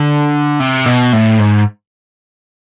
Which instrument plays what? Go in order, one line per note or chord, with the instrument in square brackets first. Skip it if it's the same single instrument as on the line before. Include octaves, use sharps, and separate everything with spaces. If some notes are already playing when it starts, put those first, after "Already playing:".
Already playing: [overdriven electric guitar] D3
C3
B2
A2
G#2